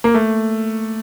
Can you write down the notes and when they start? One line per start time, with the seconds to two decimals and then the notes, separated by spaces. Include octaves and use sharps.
0.04 A#3
0.14 A3